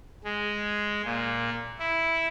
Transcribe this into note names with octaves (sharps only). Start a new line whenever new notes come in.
G#3
A#2
E4